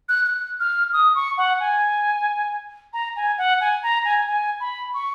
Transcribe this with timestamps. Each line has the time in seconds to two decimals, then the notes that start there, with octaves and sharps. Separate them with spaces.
0.09 F#6
0.26 F#6
0.60 F6
0.93 D#6
1.15 C#6
1.38 F#5
1.60 G#5
2.93 A#5
3.16 G#5
3.38 F#5
3.61 G#5
3.83 A#5
4.05 G#5
4.27 G#5
4.60 B5
4.94 C#6